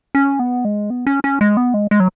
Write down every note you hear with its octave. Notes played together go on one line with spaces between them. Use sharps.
C#4
B3
G#3
B3
C#4
C#4
G#3
B3
G#3
G#3
F#3